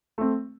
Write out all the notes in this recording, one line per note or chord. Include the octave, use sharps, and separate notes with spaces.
A3 C4